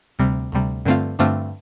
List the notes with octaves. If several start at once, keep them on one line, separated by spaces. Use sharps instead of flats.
D2 C3 G3
D2 C3 G3
G2 D3 A3 C4 F4
G2 D3 A3 C4 F4